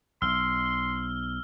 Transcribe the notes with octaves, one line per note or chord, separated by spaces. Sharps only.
B1 C6 E6 F6 G7